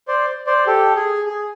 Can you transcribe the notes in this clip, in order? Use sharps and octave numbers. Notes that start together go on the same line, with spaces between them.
C5 D5
C5 D5
G4 A4
G#4
G#4